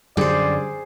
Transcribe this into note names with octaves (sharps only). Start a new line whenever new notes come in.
F#2 D3 G3 G#4 C5 D5